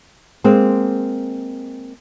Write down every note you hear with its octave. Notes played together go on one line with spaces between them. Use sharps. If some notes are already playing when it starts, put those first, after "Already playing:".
G#3 A#3 C4